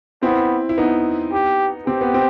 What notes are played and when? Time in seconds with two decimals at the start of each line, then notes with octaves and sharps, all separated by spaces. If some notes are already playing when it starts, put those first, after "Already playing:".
0.23 B3 C4 E4
0.69 E4
0.78 B3 D#4
1.32 G4
1.87 C4 G4
2.01 B3
2.14 C4